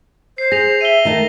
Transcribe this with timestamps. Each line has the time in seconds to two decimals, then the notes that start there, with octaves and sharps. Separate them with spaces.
0.38 C5 C7
0.52 G#4 A#6 F7
0.81 E5 D#7 G7
1.05 D#3 A3 A4 D#5